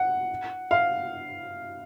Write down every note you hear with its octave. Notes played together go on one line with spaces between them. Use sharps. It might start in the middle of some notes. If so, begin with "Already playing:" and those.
Already playing: F#5
F5